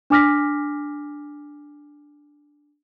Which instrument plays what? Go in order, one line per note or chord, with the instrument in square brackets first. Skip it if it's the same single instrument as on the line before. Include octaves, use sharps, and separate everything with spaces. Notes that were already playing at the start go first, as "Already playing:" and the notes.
[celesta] D4 G#5 D6 F6 A#6 B6